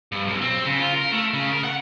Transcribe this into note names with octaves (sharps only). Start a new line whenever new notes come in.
G2
B1
C4
C#3
F4
A#4
A3
C#3
A#4
F#5